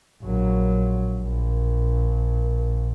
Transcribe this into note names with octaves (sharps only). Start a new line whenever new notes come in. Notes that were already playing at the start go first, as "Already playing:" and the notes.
A#1 F#3
A#1